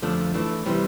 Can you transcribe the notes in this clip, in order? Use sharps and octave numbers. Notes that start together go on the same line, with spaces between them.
F2 D3 F3 A3 D4
E3 A3 D4
C3 E3 G3 C4